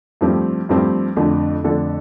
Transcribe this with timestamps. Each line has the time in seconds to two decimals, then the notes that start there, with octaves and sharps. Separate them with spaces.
0.21 G2 F3 A3 C4 G4
0.69 G2 F3 A3 C4 G4
1.16 F2 D3 A3 D4 A4
1.64 F2 D3 A3 D4 A4